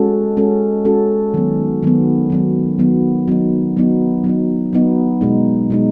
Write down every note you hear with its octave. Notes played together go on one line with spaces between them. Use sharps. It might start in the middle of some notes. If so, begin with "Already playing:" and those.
Already playing: G#3 C#4 F#4 A4
G#3 C#4 F#4 A4
G#3 C#4 F#4 A4
D#3 F#3 B3
D#3 F#3 B3
D#3 F#3 B3
D#3 F#3 B3
F#3 B3 D#4
F#3 B3 D#4
F#3 B3 D#4
F#3 B3 D#4
B2 G#3 D#4
B2 G#3 D#4